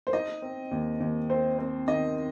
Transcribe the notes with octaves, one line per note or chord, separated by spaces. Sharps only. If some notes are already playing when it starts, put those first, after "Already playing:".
C5
D#4 D#5
C4
D#2
D#2
C4 C5
C4
D#3 D#5